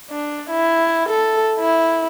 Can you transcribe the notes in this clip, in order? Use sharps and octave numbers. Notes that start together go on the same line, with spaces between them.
D4
E4
A4
E4